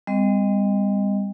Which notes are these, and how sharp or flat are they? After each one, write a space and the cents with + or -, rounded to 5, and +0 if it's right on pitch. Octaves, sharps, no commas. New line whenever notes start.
G3 +35 C4 -35 D#5 +0